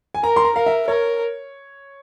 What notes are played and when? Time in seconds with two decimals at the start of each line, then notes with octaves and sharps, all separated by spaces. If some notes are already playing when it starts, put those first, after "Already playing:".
0.15 G#5
0.23 A#4 A#5
0.36 C6
0.45 A#5
0.56 A#4 F5
0.66 E5
0.88 A#4 C#5